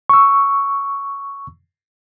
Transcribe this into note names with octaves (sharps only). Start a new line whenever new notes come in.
C#6 E6